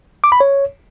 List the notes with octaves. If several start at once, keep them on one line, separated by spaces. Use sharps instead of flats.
D6
B5
C#5